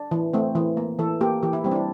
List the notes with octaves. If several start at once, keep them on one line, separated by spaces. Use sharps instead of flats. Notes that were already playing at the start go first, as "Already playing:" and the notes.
Already playing: D4
E3
A3 C4
E3
A#3
E3 A4
A#3 G4
E3 G4
E4
G3 C4 G4
D4
E4